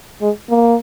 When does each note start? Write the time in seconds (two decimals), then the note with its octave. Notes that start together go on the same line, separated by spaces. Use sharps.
0.22 G#3
0.50 A#3